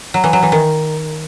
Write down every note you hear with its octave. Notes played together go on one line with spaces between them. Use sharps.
F#3
E3
F#3
E3
D#3